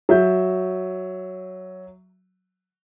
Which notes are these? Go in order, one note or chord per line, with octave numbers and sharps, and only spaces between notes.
F#3 E5 G6